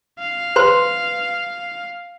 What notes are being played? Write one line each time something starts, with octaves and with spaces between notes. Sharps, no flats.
F5
B4 C5 C6